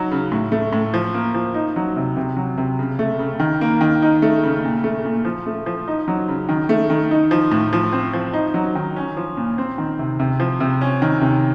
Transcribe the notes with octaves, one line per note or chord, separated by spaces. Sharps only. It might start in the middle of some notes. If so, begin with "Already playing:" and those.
Already playing: F#3 D#4
C#3
A2
A3
A2
F3
A#3
F3
D#4
F#3
C3
C3
F#3
C3
C#3
A3
C#3
D#3
A#3
D#3
D#4
A3
C#3
A#2
A3
A#2
F3
A3
F3
D#4
F#3
C#3
D#3
A3
D#3
D#4
F3
A2
F3
C4
F3
D#4
F#3
D#3
C#4
F3
A#2
C4
D#3
C3
C3
F3
C3
C#4
D#3
C3